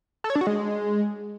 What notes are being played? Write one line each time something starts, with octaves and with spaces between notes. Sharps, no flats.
A4
C#5
D4
F#4
G#3